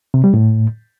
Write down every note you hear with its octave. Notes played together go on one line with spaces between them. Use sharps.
C3
G3
A2